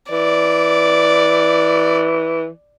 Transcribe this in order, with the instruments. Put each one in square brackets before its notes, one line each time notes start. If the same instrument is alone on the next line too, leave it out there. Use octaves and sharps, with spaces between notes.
[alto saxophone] E3 [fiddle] D5